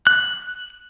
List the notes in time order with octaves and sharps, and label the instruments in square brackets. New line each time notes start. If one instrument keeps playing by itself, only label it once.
[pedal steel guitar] F#6